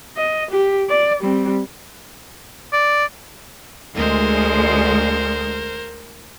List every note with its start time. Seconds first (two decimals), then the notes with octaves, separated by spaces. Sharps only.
0.17 D#5
0.51 G4
0.90 D5
1.21 G3 C4
2.73 D5
3.95 D2 G#3 A#4 C5